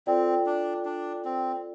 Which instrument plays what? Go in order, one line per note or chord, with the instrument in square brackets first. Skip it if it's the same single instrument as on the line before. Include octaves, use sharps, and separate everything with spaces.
[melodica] C4 [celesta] F4 A4 D5 G5
[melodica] D4
D4
C4